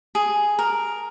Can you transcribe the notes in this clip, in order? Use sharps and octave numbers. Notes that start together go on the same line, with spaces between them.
G#4
A#4